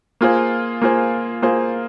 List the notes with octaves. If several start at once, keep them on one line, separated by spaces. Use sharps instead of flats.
A#3 F4 G#4 C5
A#3 F4 G#4 C5
A#3 F4 G#4 C5